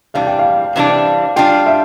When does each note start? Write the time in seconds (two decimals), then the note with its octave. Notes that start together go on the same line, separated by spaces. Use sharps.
0.14 C3 E3 G3 D4 F5
0.26 G5
0.39 F5
0.76 C3 E3 G3 D4
1.36 G3 D4 F4 G5
1.66 E5